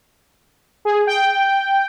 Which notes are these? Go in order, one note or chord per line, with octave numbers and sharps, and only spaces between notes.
G#4
G5